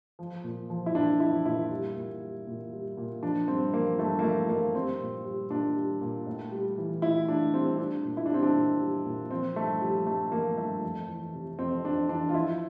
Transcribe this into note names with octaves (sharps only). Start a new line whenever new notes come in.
F3
A#2
F3
E4
A#2 D4
F3 E4
A#2 E4
G3
A#2
G3
A#2
G3
A#2
F3 D4
G2 C4
F3 A#3
G2 A3
A#3
F3 A3
G2 A#3
G3 C4
A#2
G3
A#2 D4
G3
A#2
A2
G3
E3
A2 E4
A2 D4
G3 C4
G3 D4
A#2
E4
D4
G3 C4
D4
A#2
G3
A#2
F3 C4
G2 A3
F3 G3
G2 A3
F3 A#3
G2 A3
F2
E3
C3
F2 C4
F2 D4
E3 D4
F4
F3 E4